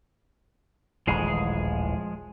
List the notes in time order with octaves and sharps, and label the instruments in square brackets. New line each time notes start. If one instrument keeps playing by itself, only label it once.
[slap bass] D#1 A1 E3 [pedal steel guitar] F3 G#3 G#4